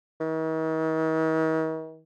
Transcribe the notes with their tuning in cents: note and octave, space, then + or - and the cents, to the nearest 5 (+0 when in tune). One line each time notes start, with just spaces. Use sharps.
D#3 +45